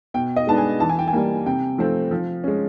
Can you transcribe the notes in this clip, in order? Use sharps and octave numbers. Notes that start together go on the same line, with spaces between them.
B2 G5
D#5
G#3 B3 D4 A5
G#5
E3 A5
G#5
G5
G#5
G3 A#3
C3 G5
F3 A3 C4
F3
G#3 C#4